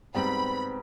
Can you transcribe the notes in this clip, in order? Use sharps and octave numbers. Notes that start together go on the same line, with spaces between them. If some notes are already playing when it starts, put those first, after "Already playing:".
G#2 G3 B3 C4 G5 B5